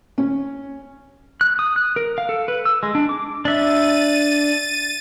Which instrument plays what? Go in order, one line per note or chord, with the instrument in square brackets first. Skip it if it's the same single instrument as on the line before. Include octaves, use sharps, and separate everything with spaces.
[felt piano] C#4
[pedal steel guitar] F#6
D#6
F#6
A#4
F5
A4
B4
E6
G#3
D4
D6
[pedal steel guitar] D4 E5 [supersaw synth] A6 D#7